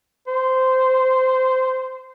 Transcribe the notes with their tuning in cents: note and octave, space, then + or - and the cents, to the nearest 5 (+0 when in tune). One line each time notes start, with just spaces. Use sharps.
C5 -15